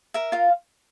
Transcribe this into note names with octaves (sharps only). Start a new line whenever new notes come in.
A#4 E5
F4 F5